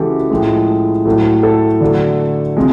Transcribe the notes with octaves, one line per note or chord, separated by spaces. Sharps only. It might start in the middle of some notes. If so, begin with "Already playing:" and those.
Already playing: C#3 E3 G#3 F#4 G4 A4
A2 F3 G#3
A2 F#3 A3
A4
D3 F#3 A3
C3 F3 G#3